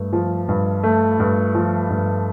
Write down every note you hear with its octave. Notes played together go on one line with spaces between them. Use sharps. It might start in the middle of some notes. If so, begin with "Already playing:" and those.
Already playing: G2 A3
F3
G2
A3
G2
F3
G2